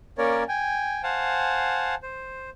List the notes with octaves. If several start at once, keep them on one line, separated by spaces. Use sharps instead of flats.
A#3 C#4 A#4 C#5 D5
G5 G#5
C5 F5 F#5 G#5 A5
C5